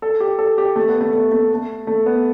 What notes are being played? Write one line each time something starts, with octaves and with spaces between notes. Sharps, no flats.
A4
G4
A4
G4
A3
B3
A3
A3
A3
A3
A3
B3